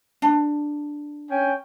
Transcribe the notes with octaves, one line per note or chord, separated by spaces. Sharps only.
D4
C#4 G5 G#5